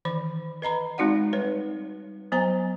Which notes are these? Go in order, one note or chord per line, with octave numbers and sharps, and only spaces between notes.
D#3 E3 B5
B4 D#5 A#5 B5
G#3 C4 D#4 F#4 D5 F#5
G3 B4 C#5
F#3 B3 C5 G#5 A#5